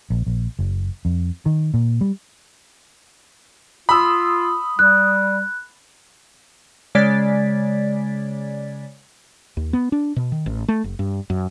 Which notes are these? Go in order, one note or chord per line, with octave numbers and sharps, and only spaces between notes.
A#1
A#1
F#1
F2
D#3
A#2
G3
F4 B5 D#6 E6
G3 F#6
C#3 G#3 D5 G#6 A6 B6
D#2
B3
D4
B2
D#3
A1
A3
F#1
G2
F#2